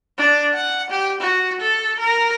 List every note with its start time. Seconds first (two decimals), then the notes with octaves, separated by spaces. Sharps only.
0.18 D4
0.54 F#5
0.90 G4
1.21 F#4
1.61 A4
2.00 A#4